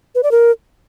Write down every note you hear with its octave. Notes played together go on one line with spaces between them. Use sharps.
B4
D5
A#4